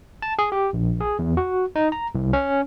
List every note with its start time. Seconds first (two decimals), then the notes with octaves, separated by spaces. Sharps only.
0.22 A5
0.39 G#4
0.52 G4
0.73 A#1
1.01 G#4
1.19 E2
1.37 F#4
1.76 D#4
1.92 A#5
2.15 C2
2.33 C#4